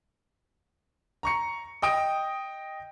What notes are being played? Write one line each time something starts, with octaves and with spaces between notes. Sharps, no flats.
A#5 C#6 C#7
D#5 G5 D#6 D7